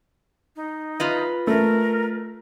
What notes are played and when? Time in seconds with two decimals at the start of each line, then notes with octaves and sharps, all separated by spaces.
0.56 D#4
1.00 F4 B4 D#5
1.47 A3 A#4